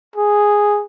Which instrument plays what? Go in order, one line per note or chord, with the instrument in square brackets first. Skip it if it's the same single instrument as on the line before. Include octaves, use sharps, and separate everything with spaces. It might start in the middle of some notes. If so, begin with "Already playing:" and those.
[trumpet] G#4